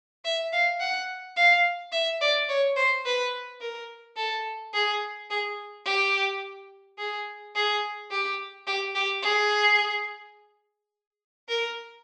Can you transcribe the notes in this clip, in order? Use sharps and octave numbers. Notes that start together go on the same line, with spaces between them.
E5
F5
F#5
F5
E5
D5
C#5
C5
B4
A#4
A4
G#4
G#4
G4
G#4
G#4
G4
G4
G4
G#4
A#4